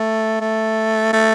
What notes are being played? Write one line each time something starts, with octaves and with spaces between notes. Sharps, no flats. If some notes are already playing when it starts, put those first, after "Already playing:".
Already playing: A3
A3
A3